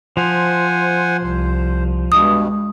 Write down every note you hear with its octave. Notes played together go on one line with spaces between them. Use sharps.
F3 C5 F#5 G#5
C2 C5
G2 B2 G#3 D#6